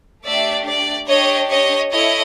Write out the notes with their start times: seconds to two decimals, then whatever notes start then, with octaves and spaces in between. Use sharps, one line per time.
0.24 A3 D4 G4 D5 E5
0.66 D5
1.08 D4 G4 C#5 D#5
1.50 C#5 D#5
1.91 E4 A4 C#5 D#5